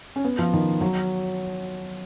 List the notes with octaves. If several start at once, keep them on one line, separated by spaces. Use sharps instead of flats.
C#4
B3
F3
D#3
F#3